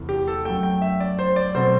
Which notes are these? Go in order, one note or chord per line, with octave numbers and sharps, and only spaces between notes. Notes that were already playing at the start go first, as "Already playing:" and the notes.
Already playing: E2 C3 E3 A3
G4
A4
F#2 F#3 A3 G5
G5
E5
D5
C5
D5
B2 F#3 A3 C4 C5